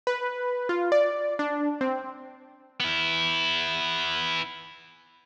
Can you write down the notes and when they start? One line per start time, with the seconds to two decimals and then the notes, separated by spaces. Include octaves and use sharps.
0.07 B4
0.69 F4
0.92 D5
1.39 D4
1.81 C4
2.80 B3 E4